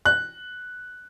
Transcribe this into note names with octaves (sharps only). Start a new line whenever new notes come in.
F#6